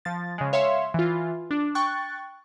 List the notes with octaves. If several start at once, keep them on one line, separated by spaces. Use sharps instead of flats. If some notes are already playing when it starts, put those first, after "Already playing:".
F3 A6
C#3 G#3
C#5 E5 F5 C6
E3 F4
D4
G5 C#6 F#6 A6